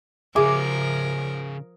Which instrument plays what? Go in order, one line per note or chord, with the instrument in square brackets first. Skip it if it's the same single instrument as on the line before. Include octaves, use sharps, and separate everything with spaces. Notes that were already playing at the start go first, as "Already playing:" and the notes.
[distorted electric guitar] C#3 E5 [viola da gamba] F3 A#4 [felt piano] G#4 [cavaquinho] D6